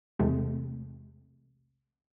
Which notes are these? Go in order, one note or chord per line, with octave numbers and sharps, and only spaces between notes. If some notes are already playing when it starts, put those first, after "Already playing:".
B1 E2 C3 G#3 A3